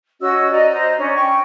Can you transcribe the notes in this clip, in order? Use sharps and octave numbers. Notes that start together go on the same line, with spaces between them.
C#4 F#4 D#5 E6
D5 D#5 A#5
C5 D#5 A#5
C#4 D4 D#5
G5 C#6